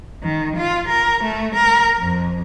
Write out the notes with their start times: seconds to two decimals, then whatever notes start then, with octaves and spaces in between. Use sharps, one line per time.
0.23 D#3
0.56 F4
0.88 A#4
1.23 A3
1.55 A#4
1.98 F2